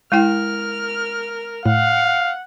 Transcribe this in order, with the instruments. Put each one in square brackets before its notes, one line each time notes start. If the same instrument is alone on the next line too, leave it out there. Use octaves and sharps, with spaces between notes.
[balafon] G#3 E4 G5 [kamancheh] A#4 F6
[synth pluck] A2 [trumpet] F5 [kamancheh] F#5